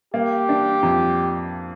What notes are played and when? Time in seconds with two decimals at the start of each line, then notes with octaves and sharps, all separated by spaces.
0.14 A#3 G4
0.49 D4
0.83 F2